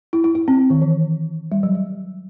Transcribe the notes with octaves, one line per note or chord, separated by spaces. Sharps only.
E4
E4
E4
C4
C4
D#3
E3
G3
F#3
F#3
G3